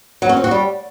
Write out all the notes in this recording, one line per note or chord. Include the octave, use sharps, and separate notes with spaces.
F#3
C#4
C4
F#4
G3